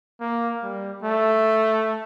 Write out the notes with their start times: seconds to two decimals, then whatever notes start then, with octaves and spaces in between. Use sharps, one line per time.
0.21 A#3
0.63 G3
1.04 A3